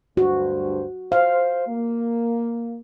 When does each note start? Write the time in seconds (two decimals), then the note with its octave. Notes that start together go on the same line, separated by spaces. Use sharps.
0.17 D2 G2 F#4 C5
1.12 C5 F5
1.67 A#3